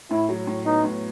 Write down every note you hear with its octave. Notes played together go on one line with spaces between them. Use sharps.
A2 E4
F#3
A2
B3 D#4
A2